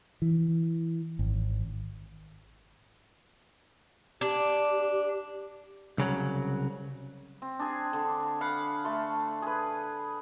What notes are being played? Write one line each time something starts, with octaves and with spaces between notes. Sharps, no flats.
E3
G#1
D4 G4
C2 C#3 F#3
C4
D4 G#4
D3
F5 F#5 B5
A3 C6
G#4 B4